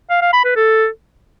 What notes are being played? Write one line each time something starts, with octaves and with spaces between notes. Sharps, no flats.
F5
F5
B5
B4
A4